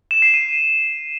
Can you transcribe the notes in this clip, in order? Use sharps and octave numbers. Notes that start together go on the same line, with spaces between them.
E7
C7
D#7